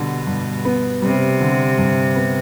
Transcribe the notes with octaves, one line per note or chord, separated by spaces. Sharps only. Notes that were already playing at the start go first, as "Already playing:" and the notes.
Already playing: B2 D3 G3
G2
B3
C3 G3
D3
G2
B3